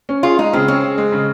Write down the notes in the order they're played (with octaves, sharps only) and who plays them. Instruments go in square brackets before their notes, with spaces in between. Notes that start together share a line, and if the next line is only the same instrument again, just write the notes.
[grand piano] C#4
[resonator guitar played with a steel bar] F4 [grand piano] G#4
[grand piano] G#3 [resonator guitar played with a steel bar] D#4
[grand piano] C#3 [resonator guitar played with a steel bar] C4
[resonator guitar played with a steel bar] C4 [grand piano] C#4
[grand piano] G#4
G#3
C#3